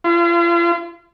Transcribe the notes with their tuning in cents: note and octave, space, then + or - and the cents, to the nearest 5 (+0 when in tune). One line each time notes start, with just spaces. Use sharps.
F4 -40